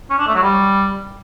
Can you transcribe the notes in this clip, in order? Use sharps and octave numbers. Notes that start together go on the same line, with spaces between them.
C#4
D4
A3
F#3
G3